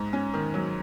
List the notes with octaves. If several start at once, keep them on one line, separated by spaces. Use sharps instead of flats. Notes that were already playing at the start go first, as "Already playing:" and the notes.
Already playing: G#2
C#4
D#3
F#3